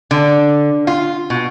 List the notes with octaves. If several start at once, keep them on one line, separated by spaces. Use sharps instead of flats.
D3
F4
B2